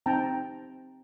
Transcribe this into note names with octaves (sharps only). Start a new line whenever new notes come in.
C4 D#4 G5 A5 A#5